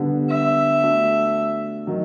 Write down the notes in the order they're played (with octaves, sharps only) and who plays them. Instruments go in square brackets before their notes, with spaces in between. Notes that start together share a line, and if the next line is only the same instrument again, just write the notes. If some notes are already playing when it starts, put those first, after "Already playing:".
Already playing: [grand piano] D3 G3 B3
[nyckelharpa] E5
[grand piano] A3 D4 F#4
D#3 F#3